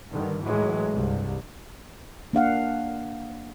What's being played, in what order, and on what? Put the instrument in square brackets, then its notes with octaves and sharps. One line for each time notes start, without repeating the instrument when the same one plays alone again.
[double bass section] G2 D3 D#3
A2 E3 F#3 G#3
C2 G2
[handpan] A#3 D4 F5 F#5